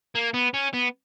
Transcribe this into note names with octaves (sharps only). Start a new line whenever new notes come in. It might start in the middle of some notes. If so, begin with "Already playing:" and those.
A#3
B3
C#4
B3